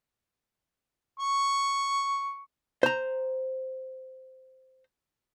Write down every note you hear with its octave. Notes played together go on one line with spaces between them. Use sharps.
C#6
C5 A#5